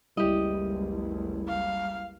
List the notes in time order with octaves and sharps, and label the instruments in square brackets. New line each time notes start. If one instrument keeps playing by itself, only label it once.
[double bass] F#1 C#2 [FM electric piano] G3 E4 [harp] G4 D#5
[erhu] F5